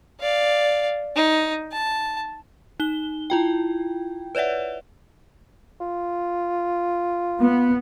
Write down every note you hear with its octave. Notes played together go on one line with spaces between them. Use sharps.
D5 F5
D#4
A5
D#4 G7
E4 F4 G5
B4 C#5 D5 E5 F#5
F4
B3